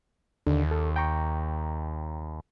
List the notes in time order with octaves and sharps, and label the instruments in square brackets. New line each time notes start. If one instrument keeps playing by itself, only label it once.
[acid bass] D#2 [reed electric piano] D3
[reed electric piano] A4
G5 A#5 C#6